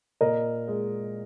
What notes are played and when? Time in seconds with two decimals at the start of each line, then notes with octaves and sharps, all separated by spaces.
0.21 A#2 A#4 D#5
0.68 G#3